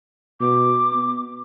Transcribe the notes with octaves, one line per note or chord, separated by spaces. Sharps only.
B2 D6
B3